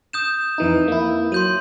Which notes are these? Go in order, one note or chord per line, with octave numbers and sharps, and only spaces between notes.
D#6 G6 E7
F2 E3 D#4
A#3 E4
F#3 C6 G6 D#7